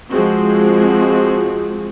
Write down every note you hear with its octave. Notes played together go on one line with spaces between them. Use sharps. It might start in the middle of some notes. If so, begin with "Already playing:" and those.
F3 G#3 C4 F#4 G#4